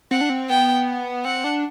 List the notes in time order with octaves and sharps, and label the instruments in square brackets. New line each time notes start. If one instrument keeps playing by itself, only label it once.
[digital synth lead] C4 [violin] F#5
[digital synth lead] D4
C4
[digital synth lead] B3 [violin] G5
[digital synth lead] C4 [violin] F#5
[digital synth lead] D4